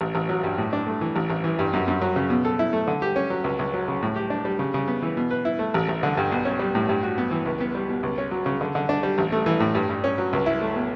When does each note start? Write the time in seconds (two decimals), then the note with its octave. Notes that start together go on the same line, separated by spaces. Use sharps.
0.01 A1
0.15 A1
0.29 F#3
0.44 G2
0.58 A2
0.73 D4
0.87 A3
1.01 E3
1.16 A1
1.30 A1
1.44 E3
1.59 G2
1.73 F#2
1.88 F#2
2.02 F#3
2.16 C#3
2.30 B2
2.45 A4
2.59 E4
2.73 A3
2.88 D3
3.02 G4
3.16 C#4
3.30 F#3
3.44 C#2
3.59 C#2
3.74 F#3
3.88 C#3
4.03 A2
4.16 G4
4.30 D4
4.45 G3
4.59 C#3
4.74 C#3
4.88 B3
5.02 E3
5.17 B2
5.31 B4
5.45 E4
5.59 A3
5.74 A1
5.89 A1
6.03 D3
6.17 G2
6.32 B1
6.45 C#4
6.59 G3
6.75 A2
6.89 G2
7.03 F#4
7.18 B3
7.31 E3
7.45 C#2
7.60 B3
7.75 G3
7.89 B2
8.03 C#2
8.18 C#4
8.31 F#3
8.46 C#3
8.61 D3
8.75 D3
8.89 D4
9.03 G3
9.18 A1
9.32 A3
9.46 E3
9.60 A2
9.75 G2
9.89 G2
10.04 C#4
10.18 F#3
10.33 C#2
10.46 E4
10.61 A3
10.75 B2